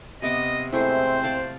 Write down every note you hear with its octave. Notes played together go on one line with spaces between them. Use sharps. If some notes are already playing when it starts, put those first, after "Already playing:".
C3 B3 D#5 D6
G#3 A3 C4 E4 C5
D5 F5 A5